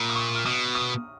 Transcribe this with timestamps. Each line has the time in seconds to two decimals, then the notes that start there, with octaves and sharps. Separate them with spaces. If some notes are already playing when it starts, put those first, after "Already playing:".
Already playing: A#2 A#5 B5
0.10 D#6
0.15 C#6
0.35 F6
0.46 B2 D#6
0.75 D#6